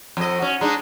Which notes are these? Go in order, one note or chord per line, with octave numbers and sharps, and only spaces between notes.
F2 D#5
C#4 F#4
G#3 D4 D#4